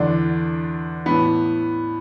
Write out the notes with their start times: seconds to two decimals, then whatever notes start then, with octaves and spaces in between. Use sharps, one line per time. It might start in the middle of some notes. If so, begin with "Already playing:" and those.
Already playing: E2 D3 D4
1.06 A2 E3 B3